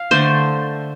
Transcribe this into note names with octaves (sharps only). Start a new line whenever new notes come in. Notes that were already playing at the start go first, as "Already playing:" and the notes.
Already playing: F5
D3 A3 C5